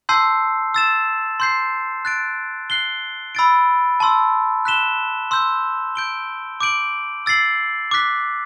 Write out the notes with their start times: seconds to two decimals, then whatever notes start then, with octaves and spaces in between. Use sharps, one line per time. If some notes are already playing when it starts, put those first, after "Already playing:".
0.09 A5 C6 E6 G6 C7
0.74 E6 A6 E7
1.40 C6 G6 C7
2.05 F#6 A6 D7
2.70 F#6 C7 G7
3.35 B5 E6 A6 D7
4.00 A5 C6 E6
4.65 F#6 B6 E7 G7
5.31 C6 E6 G6
5.95 G6 D7 G7
6.61 D6 G6 D7 F#7
7.26 E6 A6 C7 F#7
7.91 D6 F#6 B6